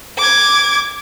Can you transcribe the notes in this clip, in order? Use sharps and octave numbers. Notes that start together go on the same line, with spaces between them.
D6 G#6